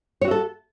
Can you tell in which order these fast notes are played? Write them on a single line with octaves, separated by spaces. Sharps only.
C#5 F#4 E5 A4